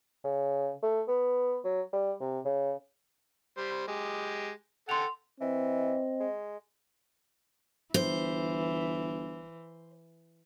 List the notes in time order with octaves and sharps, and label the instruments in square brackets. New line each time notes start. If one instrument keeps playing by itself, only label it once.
[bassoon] C#3
A3
B3
F#3
G3
C3
C#3
[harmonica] G3 C5
G#3 G4
[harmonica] A4 F#5 G5 [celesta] C6 F7
[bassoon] E3 [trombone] C4 [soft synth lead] D#5
[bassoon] G#3
[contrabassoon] G1 [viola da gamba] E3 [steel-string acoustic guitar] C5